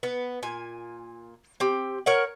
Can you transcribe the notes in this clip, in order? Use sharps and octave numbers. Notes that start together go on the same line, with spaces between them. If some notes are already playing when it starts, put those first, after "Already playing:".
B3
A#2 G#5
C4 G4
A#4 C#5 F#5